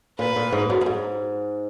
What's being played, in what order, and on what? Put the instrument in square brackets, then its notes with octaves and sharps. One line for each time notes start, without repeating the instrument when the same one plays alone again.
[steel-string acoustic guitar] A#2 [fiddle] B4
[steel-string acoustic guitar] A#2
G#2
F#2
F#2
G#2